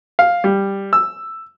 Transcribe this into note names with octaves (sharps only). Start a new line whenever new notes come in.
F5
G3
E6